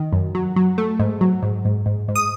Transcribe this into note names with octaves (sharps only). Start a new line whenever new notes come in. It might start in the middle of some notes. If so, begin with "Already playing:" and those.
Already playing: D#3
F#2
F#3
F#3
A3
G#2
F#3
G#2
G#2
G#2
G#2
D#6